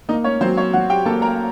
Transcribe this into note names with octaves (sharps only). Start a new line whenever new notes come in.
A#3 D#4 D#5
C#4 C#5
F#3 C4 C5
C#4 C#5
F#3 F#4 F#5
G4 G5
A#3 A4 A5
A#4 A#5